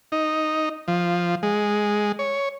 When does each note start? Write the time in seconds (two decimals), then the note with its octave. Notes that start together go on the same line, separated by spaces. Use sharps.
0.12 D#4
0.88 F3
1.43 G#3
2.19 C#5